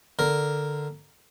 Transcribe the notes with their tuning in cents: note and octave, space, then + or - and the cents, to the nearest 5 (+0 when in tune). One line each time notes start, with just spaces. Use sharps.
D3 +0 A#4 +0